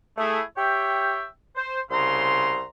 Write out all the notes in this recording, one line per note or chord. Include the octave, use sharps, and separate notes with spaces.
A3 E4 G#4
G4 C#5 E5 G5
C5
C2 C#3 A#5 C6